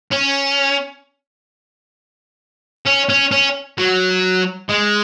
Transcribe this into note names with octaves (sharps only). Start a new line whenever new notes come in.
C#4
C#4
C#4
C#4
F#3
G#3